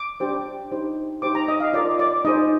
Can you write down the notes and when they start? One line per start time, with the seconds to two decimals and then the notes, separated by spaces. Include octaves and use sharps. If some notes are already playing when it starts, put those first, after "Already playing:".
Already playing: D6
0.20 D4 G4 C5
0.72 D#4 G4 C5
1.22 D#4 G4 C5 D6
1.35 A#5
1.48 D#5
1.60 F5
1.73 F4 A#4 D5
1.99 D5
2.25 D#4 G#4 C5 D#5